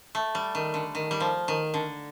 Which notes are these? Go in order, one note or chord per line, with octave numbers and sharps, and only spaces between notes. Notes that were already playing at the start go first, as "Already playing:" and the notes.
A3
G3
D#3
D3
D#3
G3
F3
D#3
D3